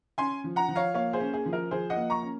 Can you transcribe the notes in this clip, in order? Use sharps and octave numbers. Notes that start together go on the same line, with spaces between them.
C#4 G#5 C6
F3
F#5 A#5
F3
C#5 F5
A#3 C#5 F5
G#4 C5
C#4
G#4
F3
A#4
F3 G#4 C5
D#5 F#5
A#3
A#5 C#6
C#4